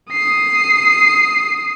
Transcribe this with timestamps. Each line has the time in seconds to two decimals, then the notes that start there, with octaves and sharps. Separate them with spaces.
0.11 D#6 C7